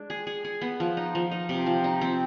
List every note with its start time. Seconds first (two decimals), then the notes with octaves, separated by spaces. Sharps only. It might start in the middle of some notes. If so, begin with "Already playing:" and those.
Already playing: G#3 D4
0.10 G#4
0.27 G#4
0.45 G#4
0.61 B3
0.80 F3
0.97 D#4
1.15 F3
1.31 D#4
1.49 C3
1.66 F3
1.84 D#4
2.01 C4